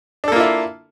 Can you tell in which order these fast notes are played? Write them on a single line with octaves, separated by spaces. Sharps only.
D4 A4 A#3 F4 E4